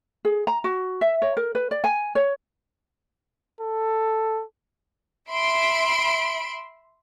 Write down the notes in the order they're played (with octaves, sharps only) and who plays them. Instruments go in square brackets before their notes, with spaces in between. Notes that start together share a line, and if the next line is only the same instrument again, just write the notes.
[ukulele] G#4
A#5
F#4
E5
C#5
A#4
B4
D5
G#5
C#5
[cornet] A4
[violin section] E5 B5 C6 D7